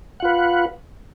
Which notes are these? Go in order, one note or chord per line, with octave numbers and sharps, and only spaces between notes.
F4 B4 F#5